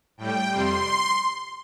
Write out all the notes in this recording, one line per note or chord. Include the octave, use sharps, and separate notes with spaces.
A2 G3 G5
F2 C3 G3 C6